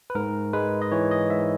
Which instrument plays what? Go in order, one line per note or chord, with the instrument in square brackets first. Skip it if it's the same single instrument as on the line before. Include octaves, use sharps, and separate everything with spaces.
[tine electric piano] B4
G#2 A#4
G#3 B4
D#5
E3 C#5
D#5
G#2 E5